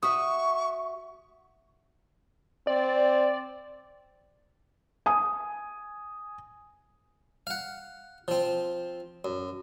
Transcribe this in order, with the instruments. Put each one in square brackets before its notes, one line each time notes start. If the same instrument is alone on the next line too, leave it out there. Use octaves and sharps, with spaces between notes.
[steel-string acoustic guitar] F#4 E5 [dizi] C#6 [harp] D#6
[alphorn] C4 [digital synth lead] D5
[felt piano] G#5 D#6
[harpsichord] F5 F#5
F3 C4
F#2